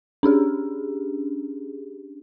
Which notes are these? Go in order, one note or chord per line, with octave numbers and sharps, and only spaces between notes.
C#4 D4 G4 G#4